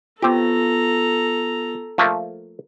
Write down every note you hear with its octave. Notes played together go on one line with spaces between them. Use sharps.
B3 C4 F4 G4 A4 A#5
F3 A3 A#3